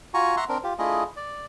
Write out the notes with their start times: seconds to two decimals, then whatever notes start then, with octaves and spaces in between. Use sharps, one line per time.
0.14 F4 F#4 G#5 A#5 C#6
0.37 E5 F#5 A#5 C6 C#6
0.49 C4 D4 A#4
0.64 F4 G4
0.79 A3 D4 E4 F4 G#4 D#5
1.17 D5